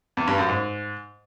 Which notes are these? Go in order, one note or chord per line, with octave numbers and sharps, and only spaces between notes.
E2
G2
F#2
G#2